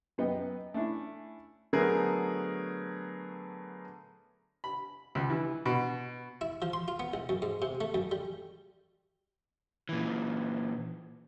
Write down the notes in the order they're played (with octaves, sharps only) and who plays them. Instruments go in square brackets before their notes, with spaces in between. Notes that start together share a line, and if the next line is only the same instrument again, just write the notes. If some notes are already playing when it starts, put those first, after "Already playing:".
[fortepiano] F#2 B3 D#5 G5
A3 C#4 D4 E4
[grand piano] D3 F#3 A3 B3 G#4 A#4
[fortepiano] B5
C#2
E3
B2
[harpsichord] E4
F3
C6
F4
B3
C2
F#2
G#2
C3
A3
F#2
G3
[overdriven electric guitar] A#2 E3